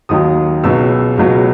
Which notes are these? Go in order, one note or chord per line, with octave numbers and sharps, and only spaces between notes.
D#2 D#3 F#3 D#6
C#2 B2 F#3 E6
C#2 B2 F#3